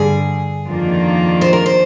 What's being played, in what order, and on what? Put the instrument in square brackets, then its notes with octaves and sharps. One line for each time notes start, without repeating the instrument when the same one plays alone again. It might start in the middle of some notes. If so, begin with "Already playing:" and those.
Already playing: [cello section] G2 D3 G3 [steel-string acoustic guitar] G#4
[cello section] F2 D#3 A#3 D4 F4
[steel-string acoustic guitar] C5
A#4
C5